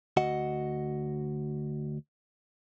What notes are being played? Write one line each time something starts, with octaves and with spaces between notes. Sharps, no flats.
D2 F#4 D#5 F#5